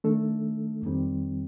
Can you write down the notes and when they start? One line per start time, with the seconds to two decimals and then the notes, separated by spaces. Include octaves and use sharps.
0.04 D#3 A3 D4 A4
0.82 F2 D#3 G3 C4